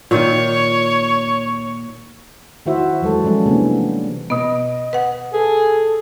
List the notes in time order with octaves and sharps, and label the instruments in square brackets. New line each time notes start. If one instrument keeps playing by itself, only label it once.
[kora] A#2 D#3 [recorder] C#5
[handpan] D#3 E4 F#4 C5 E5
E3 F#3 G#3 A4
F3 G3 G#3 C#4 F#4
C3 E3 G3 A#3 B3 D4
[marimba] B2 B3 [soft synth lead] D#5
[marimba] B4 F#5
[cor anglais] G#4 [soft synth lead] A4